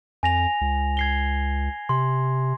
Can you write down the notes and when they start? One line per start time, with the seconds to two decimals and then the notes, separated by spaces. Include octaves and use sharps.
0.23 F2 G#5 A#6 F7
0.61 C#2
0.97 G#6 C7 G7
1.89 C3 C6